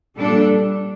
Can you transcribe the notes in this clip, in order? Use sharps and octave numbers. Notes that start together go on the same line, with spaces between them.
A#2 G3 D4 A4